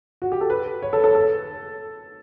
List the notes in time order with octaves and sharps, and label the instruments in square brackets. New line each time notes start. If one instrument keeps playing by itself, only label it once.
[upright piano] F#4
G4
A4
B4
C#5
A4
A4
A4